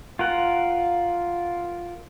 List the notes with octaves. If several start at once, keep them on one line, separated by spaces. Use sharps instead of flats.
F4 A#4 F#5